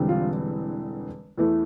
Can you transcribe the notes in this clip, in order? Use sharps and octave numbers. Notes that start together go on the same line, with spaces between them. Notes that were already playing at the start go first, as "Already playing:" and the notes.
Already playing: E1 E2 D3 G3 C4
F4
E2 E3 A3